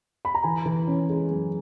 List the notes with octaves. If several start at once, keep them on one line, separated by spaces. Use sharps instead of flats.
B5
A#5
E3 G#5
E3
C#4
G#3
F#2